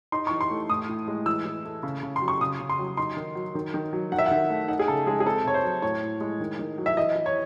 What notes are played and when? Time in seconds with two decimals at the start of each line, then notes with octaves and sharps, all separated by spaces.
0.12 D#4 C6
0.27 E3 C#6
0.41 C6
0.51 A3
0.70 A2 D#6
0.89 A2
1.08 G#3
1.26 E3 E6
1.45 E3
1.65 A3
1.83 C#3
2.03 C#3
2.16 C6
2.21 F#3
2.28 C#6
2.41 C#3 D#6
2.59 C#3
2.69 C6
2.79 F#3
2.97 D#4 C6
3.17 D#3
3.35 F#3
3.55 D#3
3.74 D#3
3.93 F#3
4.12 D#3 F#5
4.18 E5
4.26 F#5
4.31 D#3
4.50 A3
4.68 D#4 F#5
4.79 G#4
4.88 C#3 A4
5.07 G#3 G#4
5.20 G#4
5.25 C4 A4
5.45 C3 C#5
5.54 C5
5.64 F#3
5.82 A2 C#5
6.02 A2
6.21 G#3
6.40 D#3
6.59 D#3
6.78 F#3
6.86 E5
6.97 E3 D#5
7.15 E3
7.26 C#5